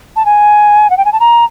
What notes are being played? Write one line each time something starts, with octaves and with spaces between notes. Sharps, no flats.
A5
G#5
F#5
G5
G#5
A5
A#5